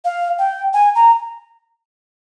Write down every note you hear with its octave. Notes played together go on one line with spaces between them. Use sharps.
F5
G5
G#5
A#5